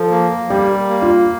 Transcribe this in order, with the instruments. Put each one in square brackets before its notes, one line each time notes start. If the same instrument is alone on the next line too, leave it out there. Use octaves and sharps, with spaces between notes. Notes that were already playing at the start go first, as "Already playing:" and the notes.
Already playing: [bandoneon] F3 [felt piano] A4
[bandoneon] A#3
[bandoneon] G3 [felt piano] G4
[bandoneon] A#3
[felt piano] F4